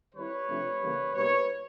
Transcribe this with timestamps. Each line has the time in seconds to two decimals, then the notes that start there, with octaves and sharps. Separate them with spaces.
0.14 D#3 G3 C4 E4 B4 C#5
0.47 C3 F3 A3 D4 F4
0.81 C#3 E3 G3 A#3
1.14 B2 G3 A#3 D#4 B4 C#5